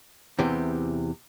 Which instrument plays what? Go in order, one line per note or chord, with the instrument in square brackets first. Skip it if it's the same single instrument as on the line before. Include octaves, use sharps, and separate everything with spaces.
[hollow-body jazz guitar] E2 C3 E3 G4